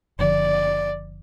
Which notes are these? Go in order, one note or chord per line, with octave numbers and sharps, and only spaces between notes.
F#1 F#2 D3 F3 D5